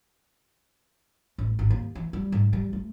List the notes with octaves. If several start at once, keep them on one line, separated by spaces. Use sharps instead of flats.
A1
G#1
D#2
E3
G3
G#2
G3
A3